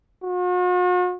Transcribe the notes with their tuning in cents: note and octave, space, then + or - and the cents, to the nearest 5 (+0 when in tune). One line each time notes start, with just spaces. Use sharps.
F#4 -45